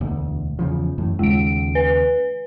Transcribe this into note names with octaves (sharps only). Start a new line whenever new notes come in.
E1 D2
E2 C#3 F3
F#2 A2 E3
D#2 C#3 G#3 D7
B4